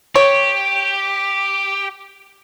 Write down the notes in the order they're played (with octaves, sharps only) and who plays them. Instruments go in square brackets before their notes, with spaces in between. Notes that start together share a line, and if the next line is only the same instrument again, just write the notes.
[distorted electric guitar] G4 [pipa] C#5